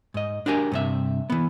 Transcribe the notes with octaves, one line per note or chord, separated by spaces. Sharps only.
G#2 D#5
D4 F#4 G4 A#4 G#5
G2 C3 E5
E3 B3